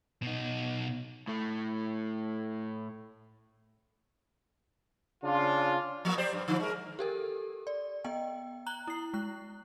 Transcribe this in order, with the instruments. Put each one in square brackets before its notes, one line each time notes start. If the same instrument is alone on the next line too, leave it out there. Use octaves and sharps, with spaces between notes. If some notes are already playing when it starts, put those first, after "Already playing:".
[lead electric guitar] B2 D#4
[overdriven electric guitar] A2 A3
[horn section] C#3 D4 F4
[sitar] F3 A#3
G4 C5 D5
G2
D3 F3
G#3 A#4
[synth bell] G4 A4 A#4
D5
B3 D#5 G5
A#5 F#6 F#7 G7
E4 C7
G#3 F#6